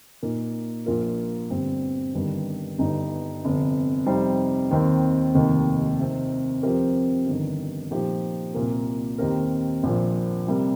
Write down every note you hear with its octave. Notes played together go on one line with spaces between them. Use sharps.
A#2 A#3 D#4
A#1 A#2 A#3 F4 A#4
G1 G2 G3 C4
G1 G2 D#3 G3
G1 G2 G3 D#4
G1 F2 C3
F2 C3 G3 D#4 C5
D#2 D#3 C4
F1 D#2 D#3
C3 D#3 C4
F2 F3 C4 G4 A#4
G1 G2 D#3
A#2 F3 D#4 G4
C2 A#2 A#3
D#2 D#3 C4 G4 A#4
A#1 A#2 F3
C3 G3 A#3